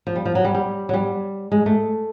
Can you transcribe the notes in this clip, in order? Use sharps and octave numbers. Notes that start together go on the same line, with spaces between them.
F3
G3
F3
F#3
G3
G3
F#3
G3
G#3
A3